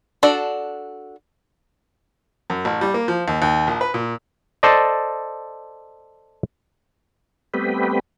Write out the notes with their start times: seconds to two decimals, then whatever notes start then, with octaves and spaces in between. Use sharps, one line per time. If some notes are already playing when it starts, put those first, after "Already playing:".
0.23 D4 F#4 A4 D5
2.50 F#2
2.65 A1
2.81 G3
2.94 A#3
3.08 F3
3.28 D#2
3.42 D#2
3.67 A#1
3.81 B4
3.94 A#2
4.63 A4 C5 D5 D#5
7.54 G3 A3 B3 C4 G4 B4